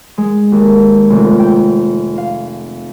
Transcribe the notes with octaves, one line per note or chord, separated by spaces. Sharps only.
G#3
D#2
F1
G5
F5